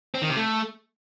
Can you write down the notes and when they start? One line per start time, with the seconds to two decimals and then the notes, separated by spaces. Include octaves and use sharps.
0.14 C4
0.22 D#3
0.29 C3
0.37 A3